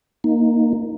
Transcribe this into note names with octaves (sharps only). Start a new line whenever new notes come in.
A#3 D#4